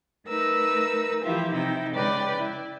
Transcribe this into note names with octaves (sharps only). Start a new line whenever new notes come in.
A3 D#4 A#4 B4 E6
E3 F3 E4 F4 G4 E5
C3 D#4 E4 G5
C#3 G#3 B4 D5 G5
E4